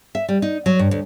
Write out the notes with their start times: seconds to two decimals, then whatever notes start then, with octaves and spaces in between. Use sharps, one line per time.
0.15 E5
0.29 G3
0.42 D#4
0.66 F#3
0.79 G2
0.91 D2